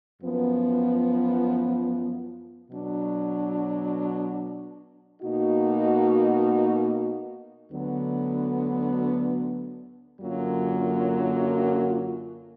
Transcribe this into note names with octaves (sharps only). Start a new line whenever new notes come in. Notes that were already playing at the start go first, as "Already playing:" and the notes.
F#2 F3 B3
B2 F#3 D4
B2 A#3 D#4 F#4
D2 D3 F#3 B3
F#2 D3 F#3 A#3 F4